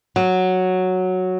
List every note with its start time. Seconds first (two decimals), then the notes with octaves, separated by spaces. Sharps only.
0.16 F#3